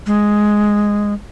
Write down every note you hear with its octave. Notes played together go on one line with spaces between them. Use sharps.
G#3